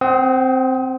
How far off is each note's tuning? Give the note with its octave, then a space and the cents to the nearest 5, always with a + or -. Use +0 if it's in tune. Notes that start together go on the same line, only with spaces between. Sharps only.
C4 +0 F#5 +45 D#6 +30